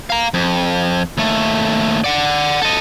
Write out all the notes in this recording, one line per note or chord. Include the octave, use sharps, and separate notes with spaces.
F5 A#5
F2
D#2 A3
D5 F#5
A4 D#5